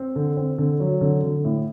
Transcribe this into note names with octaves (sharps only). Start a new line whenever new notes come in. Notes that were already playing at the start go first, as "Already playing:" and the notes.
Already playing: C4
D3
C4
D3
F#3
D3
D3
A2